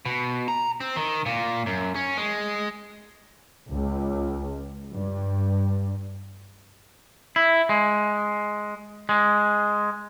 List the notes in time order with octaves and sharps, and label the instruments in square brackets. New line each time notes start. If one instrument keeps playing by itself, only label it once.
[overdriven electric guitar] B2
A#5
C4
D#3
A#2
F#2
C#4
G#3
[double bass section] C#2
G2
[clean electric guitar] E4
G#3
G#3